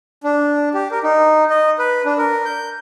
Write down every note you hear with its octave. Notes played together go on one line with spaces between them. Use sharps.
D4
G4
A#4
D#4
D#5
B4
D4
A#4
G6